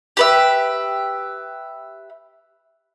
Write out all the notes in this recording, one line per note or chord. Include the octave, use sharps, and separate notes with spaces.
G4 B4 E5